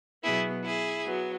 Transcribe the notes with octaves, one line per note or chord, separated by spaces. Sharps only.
B2 F#3 B3 E4 G#4
E4 G#4
F#3 B3